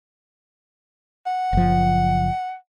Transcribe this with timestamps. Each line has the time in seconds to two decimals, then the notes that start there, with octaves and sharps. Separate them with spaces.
1.26 F#5
1.53 F#1 F3